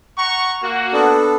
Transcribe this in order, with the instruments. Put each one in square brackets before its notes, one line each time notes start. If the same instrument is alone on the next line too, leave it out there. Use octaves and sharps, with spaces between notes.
[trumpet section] F#5 A#5 C#6
A#3 F#4
[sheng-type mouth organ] B3 D4 A4